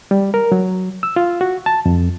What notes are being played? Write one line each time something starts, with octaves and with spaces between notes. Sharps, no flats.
G3
A#4
F#3
E6
F4
F#4
A5
F2